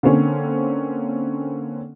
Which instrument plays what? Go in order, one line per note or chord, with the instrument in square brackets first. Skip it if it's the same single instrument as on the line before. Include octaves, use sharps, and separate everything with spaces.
[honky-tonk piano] D3 A#3 C4 C#4